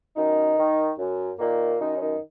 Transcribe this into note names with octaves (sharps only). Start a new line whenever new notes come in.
F#2 D#3 D#4
D#3
F#2
A#2 D#3 A#3
F#2 D#3 D#4
C#4
D#3 D#4